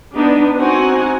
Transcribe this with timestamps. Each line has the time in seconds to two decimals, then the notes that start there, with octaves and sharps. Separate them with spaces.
0.14 B3 D4 D#4
0.58 C4 D#4 F#4 F#5 G#5